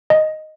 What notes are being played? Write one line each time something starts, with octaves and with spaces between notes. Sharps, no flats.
D#5